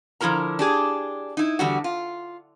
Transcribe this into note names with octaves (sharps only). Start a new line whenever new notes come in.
D3 F3 E4 F#4 A#4 A#5
D4 G4 G#4
D#4 E4
E2 D3 G3 F#4
F4